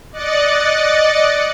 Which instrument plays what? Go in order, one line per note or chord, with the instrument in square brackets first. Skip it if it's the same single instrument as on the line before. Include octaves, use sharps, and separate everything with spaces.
[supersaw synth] D5 D#5 F#6 A6 C#7